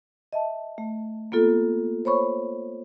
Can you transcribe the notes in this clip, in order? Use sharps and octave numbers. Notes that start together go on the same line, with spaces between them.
D#5 E5 A5
A3
A#3 B3 F4 A4
C5 C#5 B5 C#6